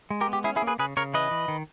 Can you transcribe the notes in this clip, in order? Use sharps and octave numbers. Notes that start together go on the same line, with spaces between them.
G#3
G4 A#4
B3
G4
C#4 E4 G#4
E4 G#4
A#3
G#4 B4
C#3 G#4 B4
C#3 A#4 C#5
E3 B4 D#5
E3
D#3